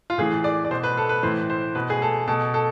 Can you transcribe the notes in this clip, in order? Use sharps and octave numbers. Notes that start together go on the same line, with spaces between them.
F4
A2 E3 G#4
D5
D5
B2 C5
B4
A4
B4
A2 E3 C5
C5
B2 B4
G#4
A4
B2 A4
A4